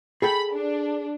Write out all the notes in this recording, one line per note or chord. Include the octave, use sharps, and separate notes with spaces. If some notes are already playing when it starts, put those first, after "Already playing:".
G#4 A4 G5 B5
D4